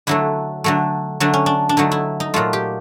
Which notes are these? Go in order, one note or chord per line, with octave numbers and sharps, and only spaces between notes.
D3 F#3 A3 E4
D3 F#3 A3
D3 F#3 A3 D4
C#4
D4
D4
D3 F#3 A3 D#4
E4
D#4
A#2 F#3 A3 F4
G4